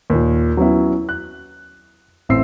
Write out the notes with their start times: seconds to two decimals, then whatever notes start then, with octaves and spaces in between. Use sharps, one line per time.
0.10 D#2 A#2
0.57 F#3 B3 C#4 E4
1.09 F#6
2.29 A1 C4 E5 E6 C7